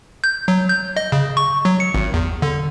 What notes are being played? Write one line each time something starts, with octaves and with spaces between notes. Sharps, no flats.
G6
F#3
G6
D#5
C#3
C#6
F#3
C#7
G#1
E2
D3